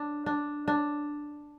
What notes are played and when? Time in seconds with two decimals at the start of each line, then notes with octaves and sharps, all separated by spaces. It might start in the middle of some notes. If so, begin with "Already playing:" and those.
Already playing: D4
0.26 D4
0.68 D4